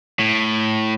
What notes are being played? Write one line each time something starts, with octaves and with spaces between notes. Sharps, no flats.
A2